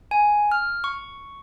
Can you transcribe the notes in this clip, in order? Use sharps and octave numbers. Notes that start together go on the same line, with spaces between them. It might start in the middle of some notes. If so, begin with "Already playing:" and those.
G#5
F6
C#6